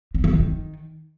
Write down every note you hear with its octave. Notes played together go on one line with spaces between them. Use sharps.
D3
E3
D#3